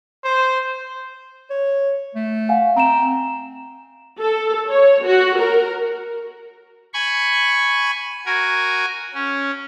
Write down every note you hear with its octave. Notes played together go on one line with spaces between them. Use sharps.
C5
C#5
A3
F5 F#5 G#5
C4 A#5 E7
A4
C#5
F#4
A#4
G#5 B5 C#6
F#4 A#4 G#5
C#4